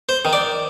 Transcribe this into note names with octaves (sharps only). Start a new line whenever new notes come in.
C5
D#3
D5